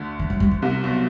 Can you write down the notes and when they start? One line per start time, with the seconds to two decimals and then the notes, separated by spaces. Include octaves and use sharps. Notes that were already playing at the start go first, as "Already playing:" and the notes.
Already playing: D2 D3
0.19 E3
0.30 F#3
0.40 G3
0.51 F3
0.62 C2 C3
0.83 B1 B2